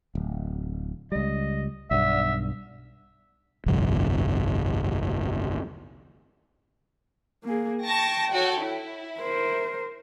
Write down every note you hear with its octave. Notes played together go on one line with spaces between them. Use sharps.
D1
C#2 G3 D#5
B1 G2 E5
G1 C2 F2
A#3 G#4
G5 A5 C#6 A#6
F#4 A4 C#5
E4
A#4 C5